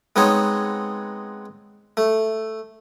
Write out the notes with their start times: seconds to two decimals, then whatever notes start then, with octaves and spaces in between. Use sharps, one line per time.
0.16 G#3 B3 C4 D#4 C#5
1.97 A3